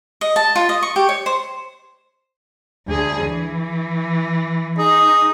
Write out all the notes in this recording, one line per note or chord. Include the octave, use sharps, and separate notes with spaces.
D#5
A5
F4
D#5
C#6
G4
C#5
C5
D2 G#4
E3
D#4 G#4